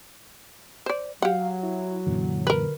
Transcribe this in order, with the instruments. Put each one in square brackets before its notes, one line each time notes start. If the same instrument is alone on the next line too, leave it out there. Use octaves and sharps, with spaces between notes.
[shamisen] C5 D5
[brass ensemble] F#3 [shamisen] G4 F#5 [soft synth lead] F5
[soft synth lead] E4
[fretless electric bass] F#2 A#2 E3 [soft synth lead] D3
[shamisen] A#4 B4